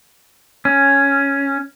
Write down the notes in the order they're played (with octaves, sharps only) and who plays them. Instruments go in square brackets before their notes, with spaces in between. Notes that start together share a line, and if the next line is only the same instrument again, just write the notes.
[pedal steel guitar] C#4